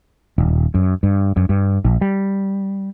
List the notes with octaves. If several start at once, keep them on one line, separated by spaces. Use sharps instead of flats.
D#1
F#2
G2
F#2
G2
A#1
G3